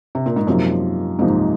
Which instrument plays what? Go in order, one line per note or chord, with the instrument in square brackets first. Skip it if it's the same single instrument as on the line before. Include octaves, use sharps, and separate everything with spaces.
[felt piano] C3
A#2
G#2
[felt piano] F#2 [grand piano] C3 F3 A#3 D#4
[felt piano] G#2 [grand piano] C3 F3 A#3 D#4